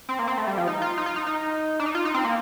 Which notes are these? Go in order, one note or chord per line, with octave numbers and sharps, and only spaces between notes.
C4
A#3
C4
A3
G3
F3
D#4
F4
D#4
F4
D#4
D#4
D4
D#4
F4
D#4
C4
A#3